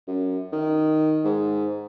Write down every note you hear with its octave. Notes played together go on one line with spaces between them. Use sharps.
F#2
D#3
G#2